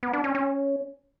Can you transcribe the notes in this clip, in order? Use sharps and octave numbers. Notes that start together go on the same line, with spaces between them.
B3
D4
C#4
C#4